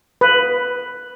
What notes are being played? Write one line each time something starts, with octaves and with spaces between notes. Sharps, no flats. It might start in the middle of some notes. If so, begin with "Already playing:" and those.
B4